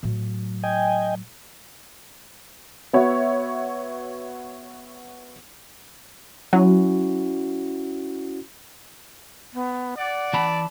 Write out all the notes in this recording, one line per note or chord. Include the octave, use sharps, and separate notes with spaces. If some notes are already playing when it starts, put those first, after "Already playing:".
A2 F#3
D#5 G5 G#5
B3 F#4 C#5 E5
F#3 C#4 E4 F#4
B3
D5 F#5
E3 A5 B5